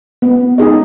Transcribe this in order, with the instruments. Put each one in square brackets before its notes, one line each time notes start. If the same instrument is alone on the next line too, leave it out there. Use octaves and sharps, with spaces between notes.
[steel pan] B3
D#4 G#4 D#5